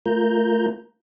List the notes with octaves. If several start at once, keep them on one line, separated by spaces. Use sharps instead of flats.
A3 F4 A#4 A#5 G6